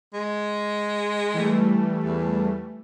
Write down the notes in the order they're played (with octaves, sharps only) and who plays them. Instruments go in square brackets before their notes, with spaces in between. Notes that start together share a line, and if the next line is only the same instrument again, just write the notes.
[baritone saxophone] G#3
[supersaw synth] E3 G3 A3
[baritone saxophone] E2